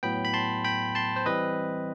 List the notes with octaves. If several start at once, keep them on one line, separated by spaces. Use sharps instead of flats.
A2 F#3 B3 G5 B5
B5
A5 C6
G5 B5
A5 C6
C5
E3 G3 C4 B4 D#5